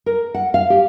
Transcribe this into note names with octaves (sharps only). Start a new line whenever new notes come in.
A#4
F#5
F5
G4